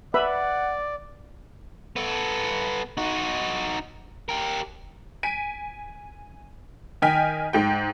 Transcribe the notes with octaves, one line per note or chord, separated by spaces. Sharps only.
B4 D5 E5 F#5 B5
B3 A4
D#4 F#4
G4 A#4
G#5 B6 D7 D#7
D#3 D#5 G5 G#5 F6 B6
G#2 G5